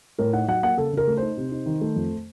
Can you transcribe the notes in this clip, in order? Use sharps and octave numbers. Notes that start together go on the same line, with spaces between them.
A2 A#4
D#4 F#5
F#3 F#5
A#3 F#5
C#3 A4
C#3 A#4
A3
D#4 C5
C3
D#4
D#3
A3
F2